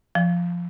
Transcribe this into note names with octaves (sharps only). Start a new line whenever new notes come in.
F3